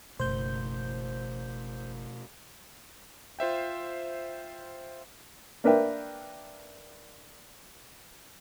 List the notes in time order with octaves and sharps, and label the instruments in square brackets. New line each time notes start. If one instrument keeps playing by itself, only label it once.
[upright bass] F#1 E3 [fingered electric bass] B2 A3 [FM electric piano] C5 G6
[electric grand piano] F4 C5 E5 G5
[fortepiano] A#3 D4 A#4 B4 E5 G5